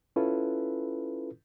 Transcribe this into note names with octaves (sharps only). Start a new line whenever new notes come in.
C#4 E4 F4 A4 B4